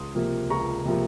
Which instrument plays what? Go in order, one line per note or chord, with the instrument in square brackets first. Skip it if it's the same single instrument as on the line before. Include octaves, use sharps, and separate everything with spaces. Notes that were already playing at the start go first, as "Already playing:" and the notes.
Already playing: [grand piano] C#2 C6 D#6
C3 F3 A#3
C#2 A#5 C#6
C3 F3 A#3